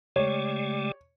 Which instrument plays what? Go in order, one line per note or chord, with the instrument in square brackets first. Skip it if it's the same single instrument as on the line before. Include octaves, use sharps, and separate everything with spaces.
[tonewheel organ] C#3 G#3 A3 [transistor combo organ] G4 D5 [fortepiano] C#5